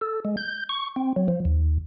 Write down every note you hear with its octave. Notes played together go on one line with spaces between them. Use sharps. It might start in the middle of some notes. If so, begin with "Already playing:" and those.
A4
G#3
G6
C#6
C4
F#3
F3
D#2